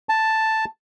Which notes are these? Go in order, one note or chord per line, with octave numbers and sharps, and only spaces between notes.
A5